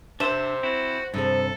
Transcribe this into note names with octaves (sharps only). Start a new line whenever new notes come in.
C3 D4 C5 E5
C4 E4 F#4
G2 C3 F3 G#4 A4